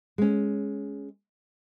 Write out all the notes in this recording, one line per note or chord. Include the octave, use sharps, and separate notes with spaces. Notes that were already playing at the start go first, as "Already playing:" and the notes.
G#3 C#4